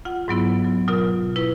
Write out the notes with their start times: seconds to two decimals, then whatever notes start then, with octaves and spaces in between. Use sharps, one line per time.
0.05 F4 F#5
0.28 G#2 F#3 B3 E4
0.65 F#3
0.88 B2 F#3 F4 A#4
1.36 E4 B4